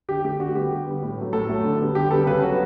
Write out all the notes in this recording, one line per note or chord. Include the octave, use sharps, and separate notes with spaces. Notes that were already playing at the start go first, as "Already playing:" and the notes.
D3 G4
A3 G4
D3 F#4
G3 B3 G4
D3
G3 B3
A2
F#3 A3
A2 A4
F#3 A3
D3
G3 B3
D3 G4
G3 B3 A4
C#3 B4
F#3 B3 F#4